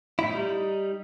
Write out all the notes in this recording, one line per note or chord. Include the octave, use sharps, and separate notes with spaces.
A2 E4
G3 D#4